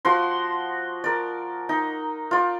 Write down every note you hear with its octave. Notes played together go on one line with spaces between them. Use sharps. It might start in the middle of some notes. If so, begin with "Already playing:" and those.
F3 F#4 C6
A#4 D5
D#4
F4 D5